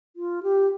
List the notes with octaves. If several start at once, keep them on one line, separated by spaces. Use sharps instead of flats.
F4
G4